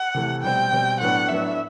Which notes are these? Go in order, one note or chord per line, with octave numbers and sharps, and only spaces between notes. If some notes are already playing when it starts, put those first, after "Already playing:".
Already playing: F#5
C3 E3 A3
B2 G3 C4 G5
B2 G3 C4
A2 F#3 B3 D4 F#5
A2 F#3 B3 D4 E5